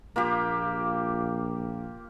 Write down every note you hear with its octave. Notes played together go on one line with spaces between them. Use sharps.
A#1 A#3 F4 G4